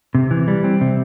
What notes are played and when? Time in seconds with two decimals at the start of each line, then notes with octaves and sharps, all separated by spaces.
0.15 C3
0.31 E3
0.48 G3
0.64 C4
0.81 C3